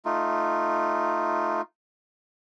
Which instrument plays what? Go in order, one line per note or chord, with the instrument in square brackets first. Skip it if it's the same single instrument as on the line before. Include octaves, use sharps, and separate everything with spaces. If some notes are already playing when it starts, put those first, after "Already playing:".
[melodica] A3 D#4 F4